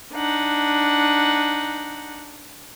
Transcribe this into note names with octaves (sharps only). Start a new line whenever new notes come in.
D4 D#4 F#5